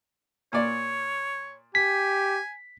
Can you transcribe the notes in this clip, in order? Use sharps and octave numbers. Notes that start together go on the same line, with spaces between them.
A#2 C#5 D5
G4 G#5 B6